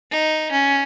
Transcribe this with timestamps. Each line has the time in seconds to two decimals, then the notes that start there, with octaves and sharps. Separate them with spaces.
0.11 D#4
0.52 C#4